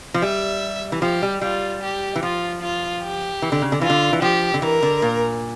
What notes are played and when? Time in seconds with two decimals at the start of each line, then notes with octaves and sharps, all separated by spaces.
0.14 F3
0.22 G3 E5
0.92 E3
1.02 F3 G4
1.22 G3
1.42 G3 F4
1.82 G4
2.16 E3
2.23 F3 F4
2.62 F4
3.02 G4
3.42 E3
3.52 D3
3.62 C#3
3.72 D3
3.81 E3 F4
3.90 D3
4.13 E3
4.22 F3 G4
4.54 D3
4.62 E3 A#4
4.83 D3
5.02 A#2